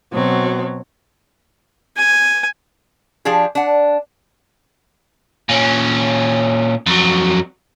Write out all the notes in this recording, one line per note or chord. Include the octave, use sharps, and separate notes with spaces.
B2 F#3 C4
G#5
F3 D4 G4 G#4
D4 F#5
A#2 C#4
F2 F#3